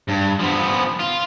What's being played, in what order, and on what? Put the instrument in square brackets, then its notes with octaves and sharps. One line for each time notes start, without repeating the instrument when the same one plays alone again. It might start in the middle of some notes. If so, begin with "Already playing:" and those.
[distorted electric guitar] G2
F3 B3
F4